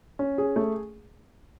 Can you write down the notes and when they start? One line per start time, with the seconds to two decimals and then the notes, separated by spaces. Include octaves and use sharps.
0.19 C#4
0.38 G#4
0.56 A3